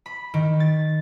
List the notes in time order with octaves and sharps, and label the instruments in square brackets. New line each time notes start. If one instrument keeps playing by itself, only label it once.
[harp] B5
D#3
A6